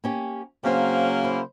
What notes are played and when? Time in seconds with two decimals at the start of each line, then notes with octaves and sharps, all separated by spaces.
0.04 A#3 C#4 G4
0.63 C#3 F#3 A#3 C4 C5
1.23 E4 C5